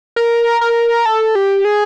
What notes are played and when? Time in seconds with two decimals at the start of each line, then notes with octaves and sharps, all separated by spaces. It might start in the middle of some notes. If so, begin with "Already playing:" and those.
0.16 A#4
0.61 A#4
1.06 A4
1.35 G4
1.65 G#4